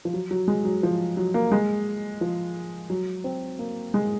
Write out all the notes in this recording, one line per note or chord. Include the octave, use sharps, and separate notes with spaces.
F3
F#3
F#3
G#3
F#3
F3
F#3
A#3
G#3
F3
F#3
C4
A#3
G#3